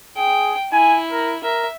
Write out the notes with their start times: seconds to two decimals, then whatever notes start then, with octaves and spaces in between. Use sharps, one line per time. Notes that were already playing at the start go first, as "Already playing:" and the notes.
0.17 G#4 G5
0.72 E4 G#5
1.12 A#4
1.44 A#4 E5